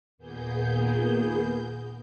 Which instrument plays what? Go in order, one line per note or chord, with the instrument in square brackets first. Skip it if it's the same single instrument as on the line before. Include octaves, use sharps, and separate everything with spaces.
[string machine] D#2 A#2 A#3 B3 G#4 G6